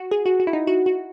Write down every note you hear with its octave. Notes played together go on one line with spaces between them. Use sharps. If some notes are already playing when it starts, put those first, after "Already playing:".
Already playing: F#4
G#4
F#4
F#4
E4
D#4
F#4
F#4